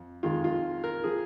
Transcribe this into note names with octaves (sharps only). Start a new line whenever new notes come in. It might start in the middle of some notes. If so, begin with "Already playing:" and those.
Already playing: F2
F2 D#3 G#3 F4
F4
A#4
F3 G#4